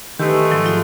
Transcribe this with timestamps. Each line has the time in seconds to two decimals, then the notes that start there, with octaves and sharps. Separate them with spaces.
0.19 D#3 G#3 A3 G4 B4
0.51 G#2 F3 F#3
0.66 F4